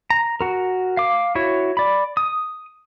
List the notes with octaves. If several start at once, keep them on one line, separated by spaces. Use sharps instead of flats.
A#5
F#4 A#4
F5 D6
E4 F#4 C#5
D5 B5
D#6